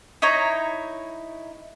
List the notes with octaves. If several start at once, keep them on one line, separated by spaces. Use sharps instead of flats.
D#4 E4 C#5 A#5